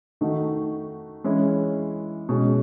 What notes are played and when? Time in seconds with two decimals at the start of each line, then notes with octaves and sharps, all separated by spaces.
0.21 D#3 A3 D#4 F#4
1.24 E3 G#3 C#4 E4
2.29 B2 G#3 C#4